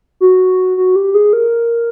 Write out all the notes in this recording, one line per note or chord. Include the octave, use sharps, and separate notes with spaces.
F#4
F#4
G4
G#4
A#4